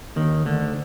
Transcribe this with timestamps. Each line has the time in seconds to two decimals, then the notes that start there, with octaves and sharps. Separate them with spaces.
0.16 D#2 D#3
0.45 D2 D3